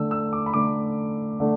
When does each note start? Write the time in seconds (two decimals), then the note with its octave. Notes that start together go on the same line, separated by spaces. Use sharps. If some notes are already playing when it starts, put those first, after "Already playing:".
Already playing: D3 A3 E6
0.11 E6
0.33 D6
0.46 B5
0.54 D3 A3 D6
1.40 D3 A3